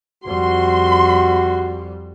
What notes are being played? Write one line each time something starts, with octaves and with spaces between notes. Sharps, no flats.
F2 G3 F#4 C6